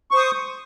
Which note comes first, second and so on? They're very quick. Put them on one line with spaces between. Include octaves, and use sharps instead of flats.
C#6 C5 D#6